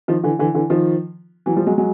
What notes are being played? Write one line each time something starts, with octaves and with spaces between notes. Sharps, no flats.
D#3 F3
D3 E3
D3 E3
D3 E3
D#3 F3
E3 F#3
F3 G3
F#3 G#3
F#3 G#3